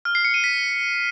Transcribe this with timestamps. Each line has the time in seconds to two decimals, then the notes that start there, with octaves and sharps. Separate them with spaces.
0.05 F6
0.15 C7
0.25 C#7
0.34 D#7
0.44 B6